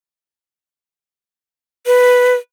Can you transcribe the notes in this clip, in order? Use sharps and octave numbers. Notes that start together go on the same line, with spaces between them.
B4